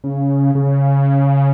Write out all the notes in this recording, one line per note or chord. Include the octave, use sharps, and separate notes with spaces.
C#3
C#3